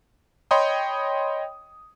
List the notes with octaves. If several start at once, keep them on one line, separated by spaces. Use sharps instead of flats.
C#5 D#5 G5 B5 C6 D#6